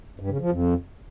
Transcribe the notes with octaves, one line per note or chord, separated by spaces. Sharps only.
G2
C#3
F3
F2